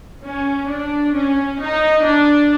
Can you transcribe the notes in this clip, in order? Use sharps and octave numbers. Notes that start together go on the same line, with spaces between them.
C#4
D4
C#4
D#4
D4